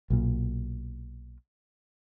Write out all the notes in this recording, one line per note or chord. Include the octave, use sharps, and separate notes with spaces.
B1 A#2